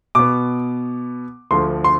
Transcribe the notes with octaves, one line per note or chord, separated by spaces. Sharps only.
B2 B3 D6
D2 D3 F3 C6
C6